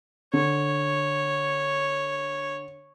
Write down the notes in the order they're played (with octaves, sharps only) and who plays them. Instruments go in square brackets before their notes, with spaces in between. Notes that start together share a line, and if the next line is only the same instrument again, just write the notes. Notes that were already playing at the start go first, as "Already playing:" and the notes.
[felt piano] D3 [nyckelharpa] C#5